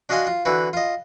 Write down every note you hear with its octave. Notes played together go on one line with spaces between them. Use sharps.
D4 F#4 D#5 F5 G#5 C6
F4
D3 E3 F#4 B4
F4 D#5